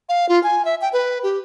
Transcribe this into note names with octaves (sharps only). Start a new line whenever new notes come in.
F5
F4
G#5
E5
G5
B4
G4